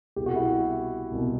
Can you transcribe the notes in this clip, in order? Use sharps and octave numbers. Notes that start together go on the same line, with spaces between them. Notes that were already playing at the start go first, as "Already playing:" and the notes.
C2 B2 G4
F#4
E4 G4
C2 B2